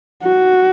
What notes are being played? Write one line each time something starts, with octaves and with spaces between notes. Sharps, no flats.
F#4